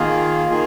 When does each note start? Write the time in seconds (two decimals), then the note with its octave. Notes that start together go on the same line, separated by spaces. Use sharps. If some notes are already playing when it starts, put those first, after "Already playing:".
Already playing: D#3 A#3 F4 G#4
0.50 D#3 A#3 F4 G#4